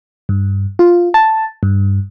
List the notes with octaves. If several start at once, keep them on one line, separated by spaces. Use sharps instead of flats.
G2
F4
A5
G2